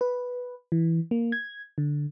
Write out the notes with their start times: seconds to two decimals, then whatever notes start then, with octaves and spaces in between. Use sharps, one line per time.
0.01 B4
0.72 E3
1.11 A#3
1.32 G#6
1.78 D3